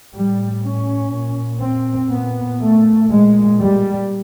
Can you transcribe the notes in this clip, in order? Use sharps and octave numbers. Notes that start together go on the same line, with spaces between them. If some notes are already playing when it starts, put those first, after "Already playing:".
A2 G3
C#4
A#2
C4
A#2 B3
A3
A#2 G#3
G3